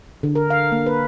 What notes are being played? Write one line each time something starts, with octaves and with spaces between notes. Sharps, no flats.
D3
A#4
F5
A#3
B4